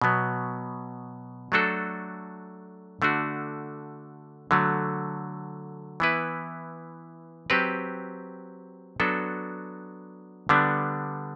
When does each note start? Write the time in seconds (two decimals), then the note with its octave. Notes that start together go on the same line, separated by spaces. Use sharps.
0.02 B2 F#3 B3
1.52 F#3 A3 D4 F#4 A4
3.02 D3 A3 D4 F#4
4.51 D3 F#3 A3
6.00 E3 B3 E4 B4
7.50 F#3 C4 G4 B4
9.00 F#3 B3 D4 F#4 A4
10.49 D3 G3 B3 D4